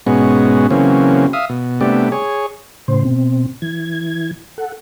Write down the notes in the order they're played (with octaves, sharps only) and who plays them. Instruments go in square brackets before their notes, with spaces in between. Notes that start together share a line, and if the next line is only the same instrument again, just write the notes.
[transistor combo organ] G#2 B2 G#3 B3 C#4 F#4
C#3 E3 F#3 A#3 C4 C#4
E5 F5 D#6
B2
C3 G3 A3 B3 D4 G4
G#4 C#5
[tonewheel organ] A2 C#3 C5
B2 C4
E3 G#6
A4 F#5